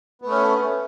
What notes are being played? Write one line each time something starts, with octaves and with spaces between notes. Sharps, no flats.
A3 B3 C#4